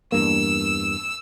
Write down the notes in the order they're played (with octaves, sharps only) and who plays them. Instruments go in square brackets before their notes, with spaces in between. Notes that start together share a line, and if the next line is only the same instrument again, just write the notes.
[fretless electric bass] E2 G2 A#3 [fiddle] E6